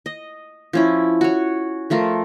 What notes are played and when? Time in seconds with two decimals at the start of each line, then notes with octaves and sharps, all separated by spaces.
0.06 D#5
0.73 F3 C#4 E4
1.21 F#4 C#5
1.90 F3 A3 F4 A#4